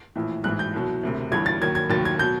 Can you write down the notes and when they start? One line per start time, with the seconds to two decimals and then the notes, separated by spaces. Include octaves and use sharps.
0.16 A#1 A2 E3
0.44 A1 G#2 E3 F#6
0.59 G6
0.74 C2 B2 F#3
1.03 E1 D2 C3
1.32 G1 G2 E3 G#6
1.46 A6
1.61 D#2 D#3 F#3 G#6
1.75 G#6
1.90 F1 D#2 D#3 F#3 A6
2.05 G#6
2.19 B2 F#3 G6